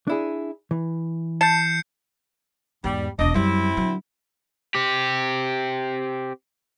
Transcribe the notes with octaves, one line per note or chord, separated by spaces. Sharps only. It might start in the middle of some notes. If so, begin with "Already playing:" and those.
D4 E4 G#4
E3
A5 G6 C7 C#7
E2 G#2 G3
E1 C#2 D4 D#5
F#2 G3 C4 E4
D3 F#3
C4 G4